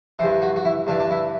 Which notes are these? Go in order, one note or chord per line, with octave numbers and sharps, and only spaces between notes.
G2 E3 C5
F#4
F#4
E4
G2 E3 D4
D4
E4